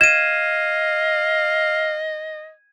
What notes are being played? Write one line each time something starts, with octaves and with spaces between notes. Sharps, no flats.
D#5 F5 G#6 D#7 E7